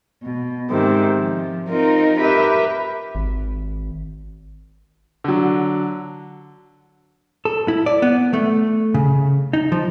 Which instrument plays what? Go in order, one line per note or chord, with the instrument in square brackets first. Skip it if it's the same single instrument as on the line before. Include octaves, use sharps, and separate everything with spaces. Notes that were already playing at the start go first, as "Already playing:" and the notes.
[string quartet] B2
G#2 C3 D#3
F3
C4 D#4 F4 A#4
G4 A#4 B4 E5
[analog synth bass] G#1
[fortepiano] D3 F#3
[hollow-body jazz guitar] A4
E4
D5
B3
A3
C#3
D#4
F3